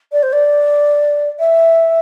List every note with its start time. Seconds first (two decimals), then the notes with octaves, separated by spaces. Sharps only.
0.12 D5
0.23 C5
0.33 D5
1.39 E5